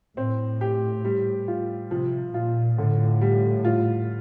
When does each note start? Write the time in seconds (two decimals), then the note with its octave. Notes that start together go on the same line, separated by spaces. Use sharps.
0.17 A2 C4
0.61 G4
1.05 G3
1.48 F4
1.91 C3 F3
2.34 A#2 F4
2.77 A2 D3
3.21 G3
3.65 F4